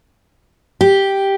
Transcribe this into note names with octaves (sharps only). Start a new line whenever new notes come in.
G4